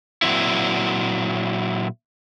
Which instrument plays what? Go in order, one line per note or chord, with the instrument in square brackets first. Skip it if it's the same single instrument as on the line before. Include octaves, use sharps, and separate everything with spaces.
[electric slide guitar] A#2 C#3 F#3 C4 E4